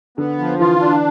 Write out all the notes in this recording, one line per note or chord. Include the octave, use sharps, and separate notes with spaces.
D3 B3
F3
E3 F4
D4